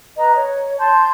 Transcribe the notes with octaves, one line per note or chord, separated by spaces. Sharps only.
B4 D#5 A#5
C#5
A5 C6 G6